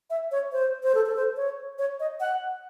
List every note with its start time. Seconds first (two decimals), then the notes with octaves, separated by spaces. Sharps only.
0.10 E5
0.32 C#5
0.52 C5
0.83 C5
0.95 A4
1.06 A4
1.16 C5
1.37 C#5
1.79 C#5
2.00 D#5
2.20 F#5